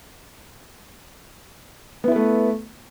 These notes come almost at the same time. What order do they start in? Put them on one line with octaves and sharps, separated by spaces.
B3 E4 B4 A3